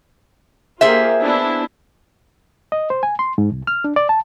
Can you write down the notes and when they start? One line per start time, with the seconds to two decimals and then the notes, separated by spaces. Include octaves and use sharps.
0.81 A#3 F4 G4 G#4 C5 E5
1.21 B3 D4 E4
2.72 D#5
2.90 C5
3.03 G#5
3.19 C6
3.38 G#2
3.52 C2
3.67 F6
3.84 D4
3.96 D5
4.09 A5